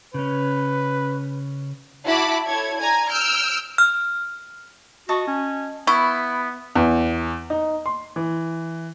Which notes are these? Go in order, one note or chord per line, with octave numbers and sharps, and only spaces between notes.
C#3 C#4 B4
E4 F#4 A5 B5 D6
E4 A4 C#5 G#6
D5 G#5 A#5 G#6
E6 F6 G6 D7
F6
F#4 D#5 A5 C#6
C#4
B3 E4 B5 C#6
E2
D#4
C6
E3